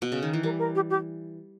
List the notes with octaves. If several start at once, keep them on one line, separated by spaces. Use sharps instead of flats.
B2
C#3
D#3
E3
G3 A#4
A#4
G4
G4